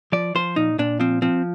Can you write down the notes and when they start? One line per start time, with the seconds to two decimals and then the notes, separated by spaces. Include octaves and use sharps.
0.12 F3 D5
0.35 F3 C5
0.56 A#2 D#4
0.79 A#2 D4
1.00 F3 C4
1.22 F3 C4